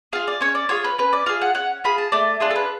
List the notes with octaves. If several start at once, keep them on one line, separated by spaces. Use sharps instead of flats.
F4 G#4 F5
D5
C#4 C#5
D5
F4 G#4 C#5
B4
C#4 B4
D5
F4 G#4 F5
F#5
C#4 F#5
F4 G#4 B5
A5
A3 D5
D4 F4 G#4
A4
B4